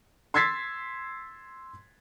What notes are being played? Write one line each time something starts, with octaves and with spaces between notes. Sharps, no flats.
C6 E6 G#6 A6 B6 C7